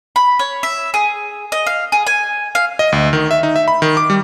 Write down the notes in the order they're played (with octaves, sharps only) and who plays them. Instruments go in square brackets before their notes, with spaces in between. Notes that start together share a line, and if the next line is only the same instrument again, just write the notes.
[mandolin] B5
C#5
E5
G#4
D#5
F5
G#4
G#5
F5
[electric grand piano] D#5
D2
D#3
E5
D#4
E5
B5
D#3
D6
G3